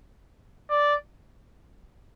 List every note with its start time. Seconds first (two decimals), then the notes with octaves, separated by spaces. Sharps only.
0.70 D5